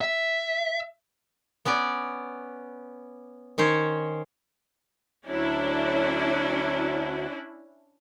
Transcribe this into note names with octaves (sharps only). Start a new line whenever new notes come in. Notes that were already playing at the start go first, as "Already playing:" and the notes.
E5
B3 C#4 B4 D5
D#3 C#4 C5 C#5
D2 F#3 C#4 D4 E4